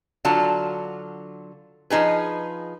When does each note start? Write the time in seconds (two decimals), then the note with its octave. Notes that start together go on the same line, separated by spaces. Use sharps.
0.25 D3 F#3 F4 A5
1.90 F3 D#4 G#4 B4